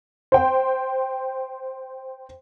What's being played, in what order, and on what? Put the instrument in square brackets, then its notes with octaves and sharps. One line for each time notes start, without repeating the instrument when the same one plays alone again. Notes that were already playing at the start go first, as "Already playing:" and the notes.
[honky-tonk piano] C5 G5